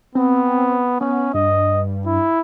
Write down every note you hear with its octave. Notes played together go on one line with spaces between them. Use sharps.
B3 C4
B3 C#4
G2 D#5
E4